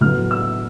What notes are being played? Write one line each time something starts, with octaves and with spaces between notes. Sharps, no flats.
A2 F#3 B3 F6
E6